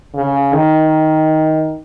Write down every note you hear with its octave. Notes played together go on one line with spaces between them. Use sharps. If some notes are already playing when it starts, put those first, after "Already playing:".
C#3
D#3